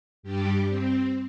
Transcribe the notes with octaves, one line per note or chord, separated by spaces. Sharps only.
G2 G3 G4
C4